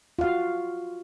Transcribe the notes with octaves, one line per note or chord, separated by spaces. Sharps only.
F4 F#4 F5